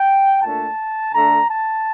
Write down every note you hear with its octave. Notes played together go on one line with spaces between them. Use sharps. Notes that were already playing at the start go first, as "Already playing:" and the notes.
Already playing: G5
A#2 A3 D4 A5
D3 A3 D4 A#5
A5